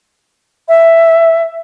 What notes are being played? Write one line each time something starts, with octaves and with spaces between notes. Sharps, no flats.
E5